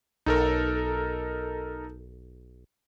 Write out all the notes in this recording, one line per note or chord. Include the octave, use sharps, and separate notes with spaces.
B1 D#4 A4 A#4